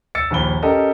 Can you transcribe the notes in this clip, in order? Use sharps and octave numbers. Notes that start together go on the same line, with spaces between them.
E6 A6 C#7
A#1 D#2 B5 G7
C#4 G4 A4 A#4 D#5